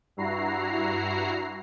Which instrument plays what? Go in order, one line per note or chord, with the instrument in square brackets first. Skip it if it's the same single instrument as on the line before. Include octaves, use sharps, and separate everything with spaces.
[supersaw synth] G2 E4 F#4 A#5 C7